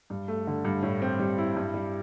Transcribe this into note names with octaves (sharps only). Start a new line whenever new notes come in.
G2
A3
D3
G2
A2
C4
G3
E4
G2
G3